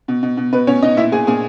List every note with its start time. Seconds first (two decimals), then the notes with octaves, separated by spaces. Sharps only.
0.08 B2
0.23 B2
0.37 B2
0.53 B2 B4
0.67 B2 C#4 C#5
0.82 B2 D#4 D#5
0.97 A#2 E4 E5
1.12 A#2 G#4 G#5
1.27 A#2 G#4 G#5